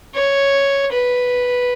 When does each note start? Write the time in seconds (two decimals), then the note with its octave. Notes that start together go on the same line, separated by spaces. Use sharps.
0.14 C#5
0.92 B4